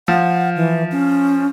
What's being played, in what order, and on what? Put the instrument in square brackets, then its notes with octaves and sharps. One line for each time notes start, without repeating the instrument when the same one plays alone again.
[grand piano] F3 [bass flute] F#5
[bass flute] E3
C#4